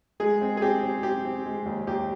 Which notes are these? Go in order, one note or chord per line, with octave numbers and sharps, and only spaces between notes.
G#3 G#4
C4
G#4
C4 G4
C4
C4 G4
C4
G#3
D#2
D#2 G4